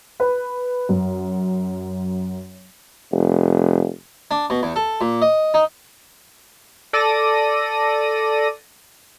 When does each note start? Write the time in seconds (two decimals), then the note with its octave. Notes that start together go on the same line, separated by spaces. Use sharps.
0.20 B4
0.89 F#2
3.12 F1
4.31 D4
4.50 B2
4.63 E2
4.76 A4
5.01 A#2
5.22 D#5
5.54 D#4
6.93 A4 D5 A#6 D#7